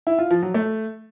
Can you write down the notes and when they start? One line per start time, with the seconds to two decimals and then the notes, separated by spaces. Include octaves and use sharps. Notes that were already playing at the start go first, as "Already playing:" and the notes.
0.07 E4
0.19 F4
0.31 F3
0.42 F#3
0.54 A3